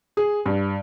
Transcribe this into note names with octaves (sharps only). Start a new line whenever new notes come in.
G#4
G2